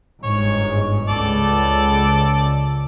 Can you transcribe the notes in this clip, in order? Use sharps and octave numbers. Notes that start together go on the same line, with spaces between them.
G1 G#2 C#5
C#2 A4 D5